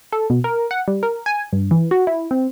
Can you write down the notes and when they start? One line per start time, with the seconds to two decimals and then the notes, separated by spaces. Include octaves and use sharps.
0.13 A4
0.30 B2
0.44 A#4
0.71 F#5
0.88 G3
1.03 A#4
1.26 G#5
1.53 G2
1.71 E3
1.91 F#4
2.07 E4
2.31 C4